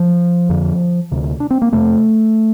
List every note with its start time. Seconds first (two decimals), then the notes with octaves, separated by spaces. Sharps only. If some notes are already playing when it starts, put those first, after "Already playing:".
Already playing: F3
0.49 F2 D3
1.12 D2 C3
1.40 D4
1.51 C4
1.62 A#3
1.72 F2 C3 A3